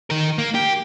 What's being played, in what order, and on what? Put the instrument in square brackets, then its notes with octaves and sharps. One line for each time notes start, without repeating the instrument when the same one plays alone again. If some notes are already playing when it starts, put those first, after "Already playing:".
[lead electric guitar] D#3 A#4
A#3
G4